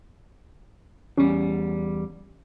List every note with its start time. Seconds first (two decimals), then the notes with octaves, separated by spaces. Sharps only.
1.18 E2 G3 C#4